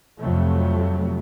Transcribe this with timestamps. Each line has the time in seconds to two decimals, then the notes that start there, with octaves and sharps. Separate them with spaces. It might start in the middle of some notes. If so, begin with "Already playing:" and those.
0.20 F2 C3 F#3 A3